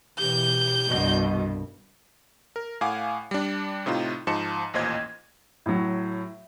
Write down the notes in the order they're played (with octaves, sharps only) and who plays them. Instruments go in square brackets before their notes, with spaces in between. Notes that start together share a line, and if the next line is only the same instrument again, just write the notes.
[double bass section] B2 E3 [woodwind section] G4 [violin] G6
[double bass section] C2 [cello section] G2 B2 [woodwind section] F#4 D5 D#5
[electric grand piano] A#4
A2 F5 F#5 G#5 D6
G3 D4
A2 C3 D#4 F4
G#2 F3 D#4 A5 C#7 E7
A1 D#2 A#2 C5 D#5 G#6
[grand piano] A2 F#3